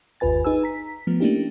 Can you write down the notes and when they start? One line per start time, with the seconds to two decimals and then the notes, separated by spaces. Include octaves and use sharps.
0.20 G1 D#2 F4 B4 G#5 A6
0.45 D#4 G#4 B4 G#5 E6
0.63 A#5 B6
1.07 F3 A3 B3
1.20 A3 A#3 C#4 D4 E4 G4